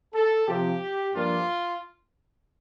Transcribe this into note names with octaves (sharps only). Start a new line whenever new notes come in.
A4
C3 F3 C4 G4
G2 F3 A#3 D4 F4